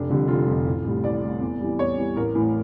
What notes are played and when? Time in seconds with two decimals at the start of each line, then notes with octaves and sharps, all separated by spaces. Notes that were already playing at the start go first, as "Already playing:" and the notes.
Already playing: F1 D4
0.10 F2 D3 G3
0.28 F1 F4
0.48 F2 D3 G3
0.66 A1
0.85 A2 G3
1.04 A1 D5
1.22 A2 G3
1.41 E2
1.60 E3 G3
1.79 E2 C#5
1.98 E3 G3
2.16 A1 A#4
2.35 A2 E3